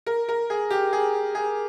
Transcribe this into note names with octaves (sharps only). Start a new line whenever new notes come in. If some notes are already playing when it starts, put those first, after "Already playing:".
A#4
A#4
G#4
G4
G#4
G#4